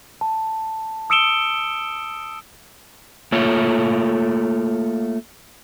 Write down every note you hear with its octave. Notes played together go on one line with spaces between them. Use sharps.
A5
D#6 E6 C#7 D7 E7 G7
A3 A#3 F4 C#5